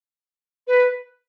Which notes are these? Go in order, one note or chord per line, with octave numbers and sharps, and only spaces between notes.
B4